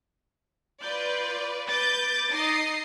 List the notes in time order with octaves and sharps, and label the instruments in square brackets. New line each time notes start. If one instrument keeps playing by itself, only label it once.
[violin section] F4 B4 D5 [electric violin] G6
[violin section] B4 G6 [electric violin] D6 A6
[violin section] D#4 D#5 C7